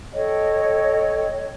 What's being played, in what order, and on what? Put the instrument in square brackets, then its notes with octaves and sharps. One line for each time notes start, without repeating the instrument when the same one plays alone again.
[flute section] A4 C#5 D#5 G5